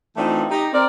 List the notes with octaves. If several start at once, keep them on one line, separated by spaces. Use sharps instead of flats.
E3 A3 C4 D4 D#4 F4
D#4 G4
C4 A#4 D5